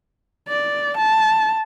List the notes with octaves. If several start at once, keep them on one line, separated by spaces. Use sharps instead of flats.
D5
A5